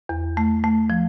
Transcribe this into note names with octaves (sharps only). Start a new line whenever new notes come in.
E2
A3
A3
F3